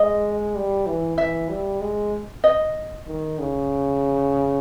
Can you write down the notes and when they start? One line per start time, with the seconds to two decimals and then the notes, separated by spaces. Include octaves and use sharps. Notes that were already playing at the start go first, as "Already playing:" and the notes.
Already playing: G#3 D#5
0.55 G3
0.87 E3
1.17 E3 E5
1.49 G3
1.81 G#3
2.44 D#5
3.08 D#3
3.39 C#3